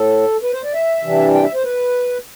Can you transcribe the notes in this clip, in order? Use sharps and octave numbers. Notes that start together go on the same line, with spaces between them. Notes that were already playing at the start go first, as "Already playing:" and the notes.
Already playing: A2 A4
B4
C5
D5
E5
C3 E3 G3 D4
G5
E5
C5
B4